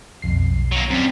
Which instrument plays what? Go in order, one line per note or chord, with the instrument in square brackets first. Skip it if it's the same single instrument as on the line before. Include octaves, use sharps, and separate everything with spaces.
[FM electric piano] B1 F2 C7
[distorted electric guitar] F#3 A#3
[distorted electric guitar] F#2 G3 [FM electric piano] C4 B6